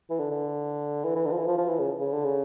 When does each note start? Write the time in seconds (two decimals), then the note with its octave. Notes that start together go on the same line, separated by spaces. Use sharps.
0.10 E3
0.20 D3
0.31 D3
1.04 E3
1.16 E3
1.26 D3
1.32 F3
1.37 E3
1.47 F3
1.58 F3
1.68 E3
1.80 C#3
2.00 C#3
2.13 D3
2.24 C#3